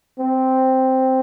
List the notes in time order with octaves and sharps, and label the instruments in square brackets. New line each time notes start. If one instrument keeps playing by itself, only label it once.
[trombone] C4